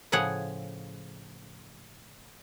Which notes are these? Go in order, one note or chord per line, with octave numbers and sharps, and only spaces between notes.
A2 C#3 F3 G#4 C#5 F#5